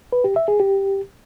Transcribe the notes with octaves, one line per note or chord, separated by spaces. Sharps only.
B4
G4
E5
G#4
G4